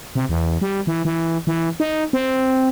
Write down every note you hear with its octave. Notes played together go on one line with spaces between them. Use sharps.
C3
E2
G3
E3
E3
E3
D#4
C4